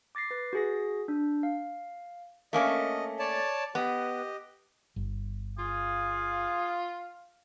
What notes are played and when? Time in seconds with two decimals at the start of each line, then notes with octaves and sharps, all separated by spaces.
0.15 D6 A6 A#6 C7
0.31 B4 A6
0.53 F#4 G#4 A#6
1.08 D4
1.43 F5
2.53 A3 A#3 C#4 D#5
3.19 C#5 D5 A5
3.75 B3 G4 D#5
4.96 G1
5.59 F4 G#4 F5